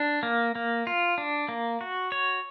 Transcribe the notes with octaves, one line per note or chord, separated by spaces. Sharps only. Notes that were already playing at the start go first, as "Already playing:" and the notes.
Already playing: D4
A#3
A#3
F4
D4
A#3
F#4
C#5